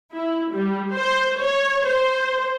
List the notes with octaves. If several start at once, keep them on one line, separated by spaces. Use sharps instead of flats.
E4
G3
C5
C#5
C5